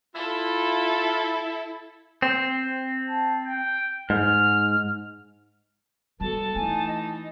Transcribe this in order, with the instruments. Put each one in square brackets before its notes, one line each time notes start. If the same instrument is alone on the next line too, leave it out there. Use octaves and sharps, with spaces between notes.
[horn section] E4 [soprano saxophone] F4 [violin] A4
[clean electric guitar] C4
[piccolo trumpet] A5
G5
[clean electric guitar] G#2 [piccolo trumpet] F6
[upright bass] E3 G3 [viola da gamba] B3 F#4 A4 [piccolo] A5
[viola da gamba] E3 D#4 [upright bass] A3 E4 [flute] G#5
[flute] D#5